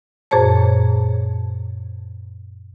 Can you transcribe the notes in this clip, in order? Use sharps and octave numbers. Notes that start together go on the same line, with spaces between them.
F#2 A#2 G#4 C5 C#5 A5